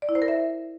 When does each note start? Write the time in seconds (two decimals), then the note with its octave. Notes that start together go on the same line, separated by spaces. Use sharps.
0.02 D5
0.09 E4
0.15 C5
0.22 A#4
0.28 E5